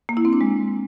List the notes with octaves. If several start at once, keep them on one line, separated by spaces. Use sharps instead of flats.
A#3
E4
C4
D4
G#3